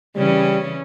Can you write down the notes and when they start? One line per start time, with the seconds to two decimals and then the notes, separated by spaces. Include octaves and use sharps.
0.16 C#3 E3 G3 C#4